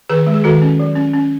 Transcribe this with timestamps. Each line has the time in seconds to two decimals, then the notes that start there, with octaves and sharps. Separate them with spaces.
0.09 D#3 G#4 B4
0.27 G#3
0.34 G#4
0.44 D#3 F#4 A4
0.62 C#4
0.79 F#3
0.96 C#4
1.14 C#4